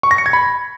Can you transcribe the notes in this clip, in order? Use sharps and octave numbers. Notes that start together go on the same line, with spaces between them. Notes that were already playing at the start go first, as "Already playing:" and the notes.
C#6
A#6
C#7
G#6
B5